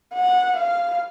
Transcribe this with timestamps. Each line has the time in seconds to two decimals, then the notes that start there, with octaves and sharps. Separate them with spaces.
0.14 F#5
0.57 F5